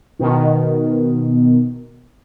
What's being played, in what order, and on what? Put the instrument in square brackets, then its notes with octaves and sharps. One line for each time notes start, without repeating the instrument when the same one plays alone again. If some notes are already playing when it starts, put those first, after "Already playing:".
[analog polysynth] B2 D#3